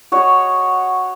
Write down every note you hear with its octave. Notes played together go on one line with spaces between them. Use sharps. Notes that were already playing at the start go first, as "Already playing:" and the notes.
F#4 C#5 D#5